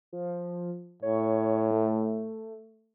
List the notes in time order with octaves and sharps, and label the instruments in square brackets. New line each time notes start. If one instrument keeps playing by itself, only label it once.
[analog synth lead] F3
[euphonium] A2 [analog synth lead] C#5
[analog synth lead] A3